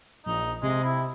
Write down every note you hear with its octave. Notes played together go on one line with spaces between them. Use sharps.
A#1 D#4
C3 G#3
E4